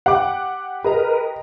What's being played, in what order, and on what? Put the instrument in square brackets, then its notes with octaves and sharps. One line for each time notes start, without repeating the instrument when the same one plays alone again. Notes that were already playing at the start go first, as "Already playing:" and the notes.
[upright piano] G4 [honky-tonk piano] F#5 D6
[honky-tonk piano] G#4 D#5 A#5 [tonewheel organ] A#4 B4